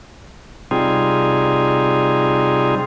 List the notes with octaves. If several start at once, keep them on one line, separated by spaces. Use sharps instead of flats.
C3 G3 C4 D#4 F4 G#4